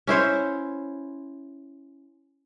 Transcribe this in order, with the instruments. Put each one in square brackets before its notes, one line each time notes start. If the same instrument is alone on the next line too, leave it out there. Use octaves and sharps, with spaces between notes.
[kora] C#4 E4 C5 C#5